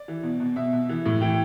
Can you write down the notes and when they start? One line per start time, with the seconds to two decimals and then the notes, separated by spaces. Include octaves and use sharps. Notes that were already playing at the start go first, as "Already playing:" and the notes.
Already playing: D5
0.08 E3
0.23 B2
0.40 B2
0.56 B2 E5
0.73 B2
0.89 E3
1.06 A2
1.21 E3 G5